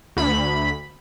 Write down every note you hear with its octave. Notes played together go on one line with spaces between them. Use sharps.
D2 B5